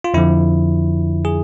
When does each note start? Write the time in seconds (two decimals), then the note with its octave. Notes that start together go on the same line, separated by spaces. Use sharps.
0.04 F4
0.14 F2 D3 F3 E4
1.25 G#4